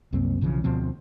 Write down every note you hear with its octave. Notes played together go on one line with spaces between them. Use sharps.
C2 F#2 A#3 C4
B1 C#3 E3 F3
D2 B2 F3 C4